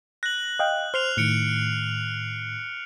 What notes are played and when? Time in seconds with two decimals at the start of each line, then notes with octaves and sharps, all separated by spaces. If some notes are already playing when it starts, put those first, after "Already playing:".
0.23 F#6 A#6 F#7
0.59 D#5 F5 G5
0.94 C5 F6 C7 F7
1.17 A2 D#3 F#6 C#7 D7